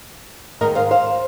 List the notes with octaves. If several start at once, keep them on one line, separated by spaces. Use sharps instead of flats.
G#2 D#3 G#3 A#4 D#5
C5 F5
C5 F5